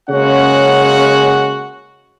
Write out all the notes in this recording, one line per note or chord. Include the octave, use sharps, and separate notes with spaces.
C#3 G#3 A#3 C#4 F#4 F#5